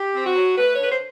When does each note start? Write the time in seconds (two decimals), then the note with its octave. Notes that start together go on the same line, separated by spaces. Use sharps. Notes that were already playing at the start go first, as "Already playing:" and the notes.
Already playing: G4
0.14 C4
0.24 F#4
0.35 F#3
0.56 A3 B4
0.73 C#5
0.78 D3 B4
0.90 C5